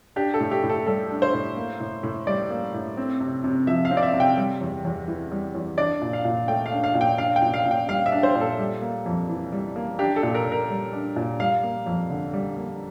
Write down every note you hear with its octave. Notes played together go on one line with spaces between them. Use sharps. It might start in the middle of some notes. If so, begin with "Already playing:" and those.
D4 G4
A4
A2
G4
A2
A4
G3 A4
D4
C5
A2
A#3
A2
A2
G3 D5
A#3
A2
C4
C3
C3
F3 E5
F5
C4
D5
E5
C3
G5
G3
E2
E2
E3
G3
E2
D4 D5
A#2
F5
A#2
A3 G5
F5
D4
F5
A#2
G5
D4 F5
G5
A#2
F5
A#2
G5
G3 F5
E5
D4
C5
A#2
A4
G3
A#3
F2
E3
G3
A#3
D4 G4
A4
A#2
A#4
A#2
A#4
G3
D4
A#2
G3 F5
A#3
F2
D3
G3
A#3